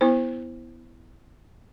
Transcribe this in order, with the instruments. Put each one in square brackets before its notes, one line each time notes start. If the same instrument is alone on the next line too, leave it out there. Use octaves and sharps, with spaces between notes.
[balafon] B3 E4 C5